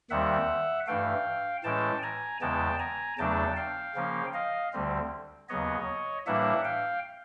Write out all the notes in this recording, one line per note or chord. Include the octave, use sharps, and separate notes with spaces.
D#2 D#3 G3 C4 E5 F#5
G2 E3 A3 F5 G5
A2 E3 G#3 C#4 G5 A5
G#5 A#5
E2 C#3 E3 G#3 B3 G5 A5
G#5 A#5
E2 C#3 F#3 A3 D4 G5 A5
F5 G5
C#3 F3 A#3 C#4
D#5 F5
D2 D3 G3 C4
D#2 C#3 F#3 B3 C#5 D#5
A2 E3 G3 A#3 D4 E5 F#5
F5 G5